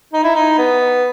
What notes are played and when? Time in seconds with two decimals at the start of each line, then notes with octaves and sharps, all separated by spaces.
0.13 D#4
0.24 E4
0.36 D#4
0.58 B3